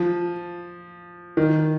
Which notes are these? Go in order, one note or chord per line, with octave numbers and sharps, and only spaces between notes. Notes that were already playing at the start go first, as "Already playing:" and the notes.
Already playing: F3
D#3